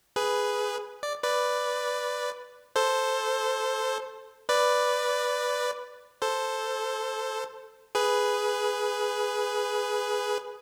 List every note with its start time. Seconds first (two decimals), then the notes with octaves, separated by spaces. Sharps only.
0.16 G#4 B4
1.03 D5
1.23 B4 D5
2.76 A4 C5
4.49 B4 D5
6.22 A4 C5
7.95 G#4 B4